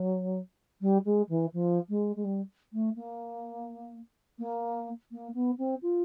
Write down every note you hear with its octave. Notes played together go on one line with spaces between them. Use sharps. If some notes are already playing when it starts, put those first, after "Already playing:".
Already playing: F#3
G3
G#3
E3
F3
G#3
G#3
G3
A3
A#3
A#3
A#3
B3
C4
F4